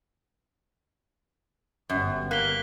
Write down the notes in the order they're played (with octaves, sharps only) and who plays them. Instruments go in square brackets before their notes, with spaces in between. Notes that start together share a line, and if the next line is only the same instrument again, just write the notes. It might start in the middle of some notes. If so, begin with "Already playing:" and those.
[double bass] G1 [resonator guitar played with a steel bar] F#2
[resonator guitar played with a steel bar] A#3 [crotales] F#6 B6 G7